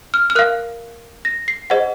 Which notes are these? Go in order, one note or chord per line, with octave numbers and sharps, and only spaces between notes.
F6
F6
A#4 F5 F#6
A#6
C7
G#4 C5 D#5 F#5